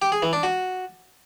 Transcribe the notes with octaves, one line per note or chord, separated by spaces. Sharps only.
G4
G#4
E3
D4
F#4